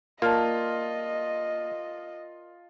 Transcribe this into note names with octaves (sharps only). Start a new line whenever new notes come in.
A#3 F4 A#4 D5 D#5 A5 F6